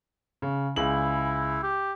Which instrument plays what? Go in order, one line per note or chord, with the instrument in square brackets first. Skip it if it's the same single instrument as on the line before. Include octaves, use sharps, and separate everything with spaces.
[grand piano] C#3
[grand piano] C#2 G#4 F#7 [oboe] E4
[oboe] G4